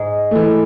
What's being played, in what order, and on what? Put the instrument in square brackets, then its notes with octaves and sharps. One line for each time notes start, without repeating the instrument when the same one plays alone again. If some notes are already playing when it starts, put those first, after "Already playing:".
Already playing: [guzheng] G#2 G#3
[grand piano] E3 A3